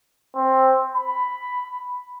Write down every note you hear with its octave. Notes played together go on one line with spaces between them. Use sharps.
C4
B5